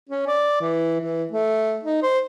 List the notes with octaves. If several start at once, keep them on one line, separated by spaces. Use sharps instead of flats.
C#4
D5
E3
E3
A3
D#4
C5